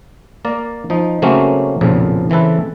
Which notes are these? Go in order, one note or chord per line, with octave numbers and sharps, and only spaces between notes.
A#3 A#4 D5
F3 D#4
C#3 F#3 A3 A#3 C4 C#4
B1 F2 A#2 C#3 F3
C#3 E3 C4 A4 B4